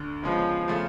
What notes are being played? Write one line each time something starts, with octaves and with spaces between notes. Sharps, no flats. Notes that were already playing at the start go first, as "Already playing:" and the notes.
Already playing: D2 D3
C#3 F3 G#3 B3
C#3 F3 A3 F4